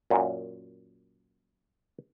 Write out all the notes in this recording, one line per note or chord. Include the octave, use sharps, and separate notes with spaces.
F#2 A#2